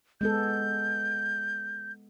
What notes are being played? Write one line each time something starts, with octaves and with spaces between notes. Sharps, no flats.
G#3 B3 A4 G6